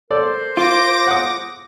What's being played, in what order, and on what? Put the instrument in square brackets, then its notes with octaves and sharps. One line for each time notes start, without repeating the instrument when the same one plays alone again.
[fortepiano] A4 D5 [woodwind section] A#4 C5
[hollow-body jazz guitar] F4 [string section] D6 A#6
[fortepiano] F#5 D#6